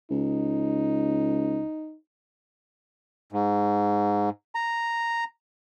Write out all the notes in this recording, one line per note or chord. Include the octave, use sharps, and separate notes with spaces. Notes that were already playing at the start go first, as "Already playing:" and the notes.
C#2 D#4
G#2
A#5